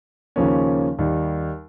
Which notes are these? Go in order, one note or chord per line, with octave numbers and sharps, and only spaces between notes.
D#2 C#3 F3 A#3 C#4
D#2 D#3 G3